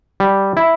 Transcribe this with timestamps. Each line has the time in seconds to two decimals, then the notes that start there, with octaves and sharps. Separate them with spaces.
0.20 G3
0.57 E4